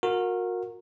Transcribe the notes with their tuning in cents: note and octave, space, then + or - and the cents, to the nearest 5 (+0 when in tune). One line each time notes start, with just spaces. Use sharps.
F#4 -30 A#4 -10